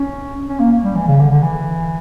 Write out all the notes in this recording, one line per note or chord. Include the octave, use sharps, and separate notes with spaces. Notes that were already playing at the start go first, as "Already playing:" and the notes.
Already playing: C#4
C#4
A#3
G3
E3
C#3
D3
D3
E3